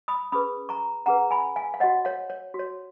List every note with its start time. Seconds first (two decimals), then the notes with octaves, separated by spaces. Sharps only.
0.08 B5 D#6
0.32 C#4 G#4 B4 B5 D#6
0.69 A#5 C#6
1.06 C#4 G#4 B4 F#5 A#5
1.31 G#5 B5
1.56 F5 G#5
1.74 F5
1.80 C#5 D#5 F#5
1.83 F#4
2.05 C#5 F5
2.30 C#5
2.54 F#4 C#5